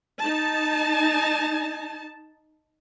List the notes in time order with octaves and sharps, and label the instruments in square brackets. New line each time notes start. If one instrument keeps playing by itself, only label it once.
[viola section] D#4 A5